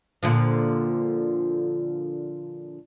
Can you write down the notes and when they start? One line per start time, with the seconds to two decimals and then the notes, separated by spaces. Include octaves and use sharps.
0.23 A#2 D3 F3